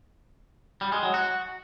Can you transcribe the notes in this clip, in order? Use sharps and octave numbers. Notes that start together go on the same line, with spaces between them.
G3
G#3
F#3
F#4